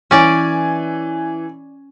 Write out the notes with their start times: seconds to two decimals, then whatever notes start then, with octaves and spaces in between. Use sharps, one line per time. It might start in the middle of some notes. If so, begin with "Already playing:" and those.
0.11 E3 C#4 D5 G#5